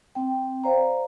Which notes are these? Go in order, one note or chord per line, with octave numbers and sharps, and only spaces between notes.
C4 G5
C5 D5 F5 A#5